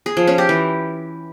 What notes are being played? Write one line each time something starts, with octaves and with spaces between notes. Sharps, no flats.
G#4
F3
C#4
G4
E3